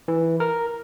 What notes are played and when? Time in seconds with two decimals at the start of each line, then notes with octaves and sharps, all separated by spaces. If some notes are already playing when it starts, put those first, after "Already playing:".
0.08 E3
0.40 A#4